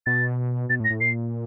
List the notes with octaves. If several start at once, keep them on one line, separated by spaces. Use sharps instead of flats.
B2 A6
B2 A6
A2
A#6
A2
A#2 C7